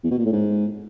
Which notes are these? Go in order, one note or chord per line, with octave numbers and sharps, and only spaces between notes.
E2
B2
A#2
A2
G#2